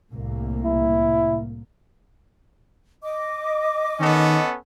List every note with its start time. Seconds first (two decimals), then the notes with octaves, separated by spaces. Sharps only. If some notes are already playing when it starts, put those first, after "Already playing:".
0.12 C2 A2 A#3
0.64 E4
3.03 D#5 D6
4.00 D#3 B3 C#4 A4